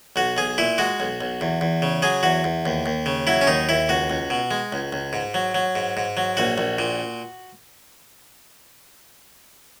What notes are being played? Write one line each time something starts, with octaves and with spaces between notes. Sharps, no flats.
B1 F#4
B1 G#4
A#2 E4
G#3 F#4
B1
B1
E2
E2
C#3
F#3 G#4
E2 F#4
E2
D#2
D#2
C#3
F#3 E4
C#4
D#2 D#4
D#2 E4
C#2 F#4
C#2
B2
G#3
C#2
C#2
G#2
F#3
F#3
G#2
G#2
F#3
A#1 F#4
A#1
A#2